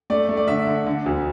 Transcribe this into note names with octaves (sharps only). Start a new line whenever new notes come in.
A3 D5
A3
D5
D3 E5
D3
D3
D2